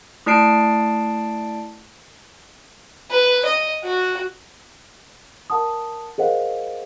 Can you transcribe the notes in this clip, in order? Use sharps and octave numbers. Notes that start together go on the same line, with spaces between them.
A3 E4 D5 A5 C7 D7
B4
D#5
F#4
A#4 F#5 A5 D#6
G#4 A#4 C5 D#5 F5 F#5